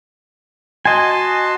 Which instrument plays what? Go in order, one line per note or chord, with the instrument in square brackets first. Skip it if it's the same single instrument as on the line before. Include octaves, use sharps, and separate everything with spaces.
[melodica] F#4 A5 C6 [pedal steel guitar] D#5 G#5